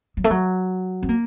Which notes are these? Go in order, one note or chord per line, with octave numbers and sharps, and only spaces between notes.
F#3
A3
F#3
C4
A#3